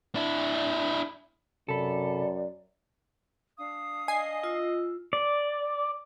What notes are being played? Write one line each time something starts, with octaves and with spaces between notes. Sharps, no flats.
D4 E4
F#2 C3 A4 D5 B5
D4 F5 D#6
D#5 G#5 C7
F4 E6
D5